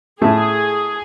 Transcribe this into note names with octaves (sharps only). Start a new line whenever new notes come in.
A2 A3 G#4